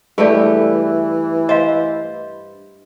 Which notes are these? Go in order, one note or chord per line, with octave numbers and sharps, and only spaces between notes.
G2 E3 A3 G4 G#4 D5
C5 D#5 F5